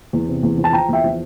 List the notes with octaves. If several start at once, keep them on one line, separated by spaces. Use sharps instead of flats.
E2
C3
E2
F3
A5
F3 G5 A#5
E2 E5 G5
F3